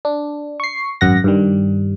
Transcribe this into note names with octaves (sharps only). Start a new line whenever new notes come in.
D4
C#6 C7
G#1 F#2 F#5 A#6
G2 D#3 G3